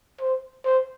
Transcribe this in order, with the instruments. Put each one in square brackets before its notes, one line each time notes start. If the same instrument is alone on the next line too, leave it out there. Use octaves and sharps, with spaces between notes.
[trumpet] C5
C5